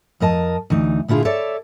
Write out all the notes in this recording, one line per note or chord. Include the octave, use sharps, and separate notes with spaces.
F2 A#4 D#5 A5
D2 E3 D#4
A#2 D3 E4 F4 G#4
A4 C#5 D5 E5